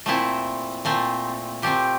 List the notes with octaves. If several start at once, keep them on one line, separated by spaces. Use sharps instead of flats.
A#2 A3 C4 E4
A#2 A3 C4
A#2 A3 C4 G4